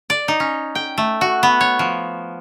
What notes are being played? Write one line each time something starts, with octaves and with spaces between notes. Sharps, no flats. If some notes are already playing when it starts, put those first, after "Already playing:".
D5
D#4
C#4
G5
A3
F#4
B3
C#5
F3